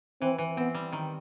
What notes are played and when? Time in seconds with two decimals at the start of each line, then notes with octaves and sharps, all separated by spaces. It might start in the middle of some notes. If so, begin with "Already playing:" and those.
0.21 E3 C4
0.38 E3
0.57 B3 C4
0.75 G3
0.93 D#3